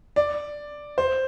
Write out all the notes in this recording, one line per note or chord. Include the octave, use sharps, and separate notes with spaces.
D5
C5